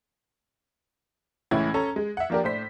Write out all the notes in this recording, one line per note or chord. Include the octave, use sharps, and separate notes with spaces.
C#2 A2 E3 C#4 E4 G#6
C#4 A4 A#5
G#3
E5 F#5
F3 A#3 D4 G4 A#4
A2 D4 C5 B6